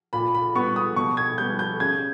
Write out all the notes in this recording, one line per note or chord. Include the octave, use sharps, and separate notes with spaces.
A#2 B5
B5
G3 B3 C#6
D#6
B2 C#6
G#6
G3 B3 G6
G6
C#3 G#6